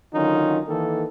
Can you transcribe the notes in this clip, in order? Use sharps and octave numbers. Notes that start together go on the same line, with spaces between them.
D3 D#3 F#3 C#4 D#4 F4
D#3 E3 A#3 A4